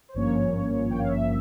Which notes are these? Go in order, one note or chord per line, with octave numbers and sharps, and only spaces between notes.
C5
G#1 G2 F3 A#3 C#4 C#5
G5
F5
E5